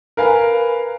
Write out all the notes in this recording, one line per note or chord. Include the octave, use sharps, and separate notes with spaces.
A#4 B4 F5 G#5